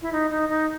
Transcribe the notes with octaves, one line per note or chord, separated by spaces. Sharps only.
E4
D#4
D#4
D#4